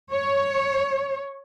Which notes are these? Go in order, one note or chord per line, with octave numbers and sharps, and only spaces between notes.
C#5